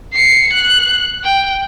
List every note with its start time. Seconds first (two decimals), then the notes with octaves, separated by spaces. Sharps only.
0.13 C7 C#7
0.53 F#6
1.24 G5